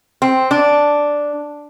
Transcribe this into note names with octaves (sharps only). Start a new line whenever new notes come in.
C4
D4